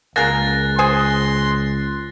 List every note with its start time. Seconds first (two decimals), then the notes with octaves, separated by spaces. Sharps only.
0.16 C#2 A#3 G#4 A#4 F#6 A6 A#6
0.79 G#4 C5 G#5 C6